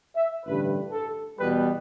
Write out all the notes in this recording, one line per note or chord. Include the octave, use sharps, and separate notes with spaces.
E5
A1 G2 D3 B4
A4
E2 B2 G3 B3 B4